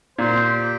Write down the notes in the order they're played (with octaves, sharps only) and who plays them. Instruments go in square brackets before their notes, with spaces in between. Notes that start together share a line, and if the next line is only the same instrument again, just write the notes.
[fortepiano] A#2 [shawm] C5
[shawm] G4